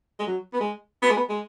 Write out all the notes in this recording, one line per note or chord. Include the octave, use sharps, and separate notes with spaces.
G#3
F#3
B3
G#3
B3
G#3
B3
G#3